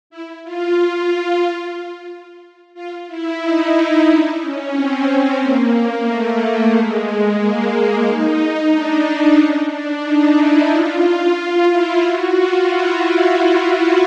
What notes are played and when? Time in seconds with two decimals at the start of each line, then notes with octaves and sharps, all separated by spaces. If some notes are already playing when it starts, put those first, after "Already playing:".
0.10 E4
0.44 F4
0.76 F4
2.74 F4
3.08 E4
3.40 D#4
4.07 D4
4.41 C#4
4.73 C4
5.07 C4
5.40 A#3
6.06 A3
6.72 G#3
7.38 A#3
8.04 D#4
8.71 D4
9.36 C#4
9.70 D4
10.03 D#4
10.36 E4
10.69 F4
11.68 E4
12.02 F#4
12.35 F4
12.67 E4